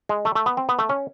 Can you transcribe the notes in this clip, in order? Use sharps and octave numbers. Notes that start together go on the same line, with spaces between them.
G#3
A3
A3
B3
C4
B3
A3
C#4